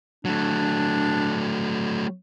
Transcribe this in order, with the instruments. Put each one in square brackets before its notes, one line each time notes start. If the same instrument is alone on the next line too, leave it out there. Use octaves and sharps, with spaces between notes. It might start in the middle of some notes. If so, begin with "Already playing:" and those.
[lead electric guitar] F#3 A3 [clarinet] D4